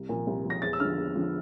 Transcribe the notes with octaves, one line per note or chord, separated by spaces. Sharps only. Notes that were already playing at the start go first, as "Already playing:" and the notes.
Already playing: C2
A#2 F3
C2
A#2 F3
A#6
E2 A6
E6
D3 F3 F6
E2
D3 F3